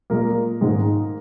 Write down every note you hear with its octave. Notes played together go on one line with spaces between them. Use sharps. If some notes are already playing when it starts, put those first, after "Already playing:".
A#2 G#3 A#3 A#4
G#2 D#3 G#3